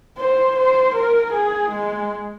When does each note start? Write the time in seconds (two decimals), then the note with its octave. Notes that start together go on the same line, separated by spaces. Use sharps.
0.18 C5
0.56 C5
0.95 A#4
1.33 G#4
1.71 G#3